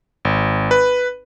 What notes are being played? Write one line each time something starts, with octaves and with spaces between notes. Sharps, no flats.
G#1
B4